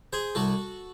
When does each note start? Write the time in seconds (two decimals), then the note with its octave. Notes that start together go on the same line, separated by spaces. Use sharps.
0.13 G#4 C5
0.35 C2 F#4 A4